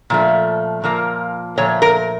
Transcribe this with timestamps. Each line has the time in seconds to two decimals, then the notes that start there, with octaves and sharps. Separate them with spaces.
0.10 A#2 F3 A3
0.84 A#2 F3 A#3
1.58 A#2 F3 A3 C#5
1.82 A#4